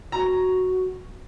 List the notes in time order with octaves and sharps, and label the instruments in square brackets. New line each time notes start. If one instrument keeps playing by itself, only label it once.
[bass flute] F#4 [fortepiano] A#5